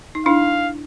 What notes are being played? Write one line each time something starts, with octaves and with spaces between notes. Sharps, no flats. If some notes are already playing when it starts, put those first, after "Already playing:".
D#4
D4 E4 F5